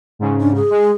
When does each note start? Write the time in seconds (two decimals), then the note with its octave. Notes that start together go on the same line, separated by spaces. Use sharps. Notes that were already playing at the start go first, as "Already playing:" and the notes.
0.19 G#2 C#3
0.41 D4
0.55 G#4
0.70 G#3